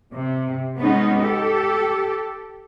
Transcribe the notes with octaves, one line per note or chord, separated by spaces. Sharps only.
C3
G#3 B3 C#4 D#4
G4 A4